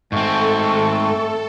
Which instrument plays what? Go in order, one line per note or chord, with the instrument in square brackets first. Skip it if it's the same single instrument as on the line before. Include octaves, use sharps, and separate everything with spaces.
[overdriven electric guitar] G#2 C4 [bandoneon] A3 [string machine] A4 [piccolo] C#6